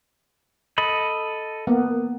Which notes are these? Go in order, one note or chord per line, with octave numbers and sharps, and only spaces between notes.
A4 D#5 B5
A#3 B3